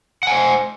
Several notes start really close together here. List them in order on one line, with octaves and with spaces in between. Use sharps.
F#5 G#5 C5